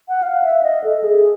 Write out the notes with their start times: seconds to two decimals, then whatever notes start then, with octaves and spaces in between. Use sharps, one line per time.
0.08 F#5
0.23 F5
0.44 E5
0.63 D#5
0.84 A4
1.04 G#4